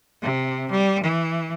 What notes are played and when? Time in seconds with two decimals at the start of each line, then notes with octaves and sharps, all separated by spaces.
0.22 C3
0.70 G3
1.03 E3